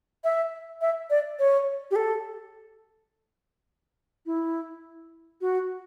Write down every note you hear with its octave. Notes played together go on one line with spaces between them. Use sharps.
E5
E5
D5
C#5
G4
A4
E4
F#4